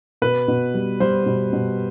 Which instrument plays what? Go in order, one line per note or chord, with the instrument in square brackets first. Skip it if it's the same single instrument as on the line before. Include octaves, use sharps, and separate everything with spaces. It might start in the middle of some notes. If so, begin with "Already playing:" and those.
[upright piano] B2 B4
B2
G3
G3 C5
B2
B2